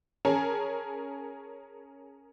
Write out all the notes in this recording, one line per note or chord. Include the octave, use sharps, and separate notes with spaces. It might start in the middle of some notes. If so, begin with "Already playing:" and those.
C#4 G#4 A#4 C#5 G#5 A5